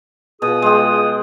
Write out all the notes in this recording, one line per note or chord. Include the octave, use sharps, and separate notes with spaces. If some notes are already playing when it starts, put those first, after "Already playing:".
B2 F4 G#4 D#6
G#3 G4